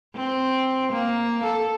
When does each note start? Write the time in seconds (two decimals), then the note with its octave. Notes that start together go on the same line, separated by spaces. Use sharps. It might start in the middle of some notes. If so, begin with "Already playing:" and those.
0.16 C4
0.92 A#3
1.44 A4